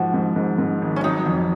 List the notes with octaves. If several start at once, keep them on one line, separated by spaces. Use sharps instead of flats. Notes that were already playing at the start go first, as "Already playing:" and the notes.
Already playing: G#2 F3 F#4
G#2
G#2
G#2
G#1
C#4
F#3 D#4
F2